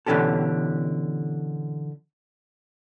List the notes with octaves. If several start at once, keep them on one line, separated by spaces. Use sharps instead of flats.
B2 D3 E3 C#4 G4 A4